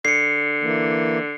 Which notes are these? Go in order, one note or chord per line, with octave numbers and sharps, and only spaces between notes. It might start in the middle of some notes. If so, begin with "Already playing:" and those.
D3 C7 C#7
E3 A#3